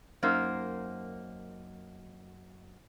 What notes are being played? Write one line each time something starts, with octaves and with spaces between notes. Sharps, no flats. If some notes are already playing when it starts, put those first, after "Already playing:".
F#2 A#3 D#4 C5